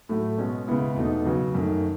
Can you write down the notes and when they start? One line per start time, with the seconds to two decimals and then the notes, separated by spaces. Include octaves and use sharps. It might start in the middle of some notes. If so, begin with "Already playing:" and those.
0.09 A2 F#3 A3 E4
0.38 B2 G#3 C#4
0.68 C#3 G#3 B3 E4
0.96 E2 B2 A3 D#4
1.25 C#3 F#3 B3
1.54 F#2 D#3 A3